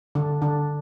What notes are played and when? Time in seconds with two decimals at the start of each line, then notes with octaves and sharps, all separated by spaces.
0.15 D3 D4
0.41 D3 D4